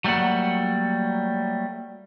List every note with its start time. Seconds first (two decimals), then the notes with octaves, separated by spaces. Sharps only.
0.04 F#3 G3 A3 A#3 F#5